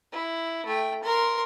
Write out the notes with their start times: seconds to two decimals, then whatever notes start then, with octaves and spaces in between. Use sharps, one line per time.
0.13 E4
0.66 A3 G5
1.03 A#4 C6